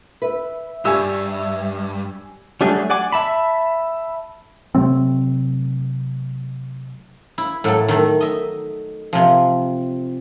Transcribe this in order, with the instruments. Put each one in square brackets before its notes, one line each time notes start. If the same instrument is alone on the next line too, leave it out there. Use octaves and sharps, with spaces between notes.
[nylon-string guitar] B4 [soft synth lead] E5
[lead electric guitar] G2 [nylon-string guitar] G4 D5 [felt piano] G#5 C#6 E6
[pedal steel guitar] F#3 G3 A3 D4 G#4
D5 F#5 G#5 D6
E5 A5 B5
[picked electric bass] C3 F#3 A3 C4
[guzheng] E4
A2 F#3 A4
D#3 A3
D#5 E5
C3 F3